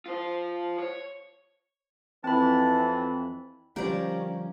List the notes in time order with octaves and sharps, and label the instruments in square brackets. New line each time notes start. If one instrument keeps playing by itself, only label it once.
[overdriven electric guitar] F4 C5
C#5
[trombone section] F2 E3 [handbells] C4 B5 [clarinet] A5
[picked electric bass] D3 F3 G3 [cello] C#4 [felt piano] G4 C5 [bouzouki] A#4 D5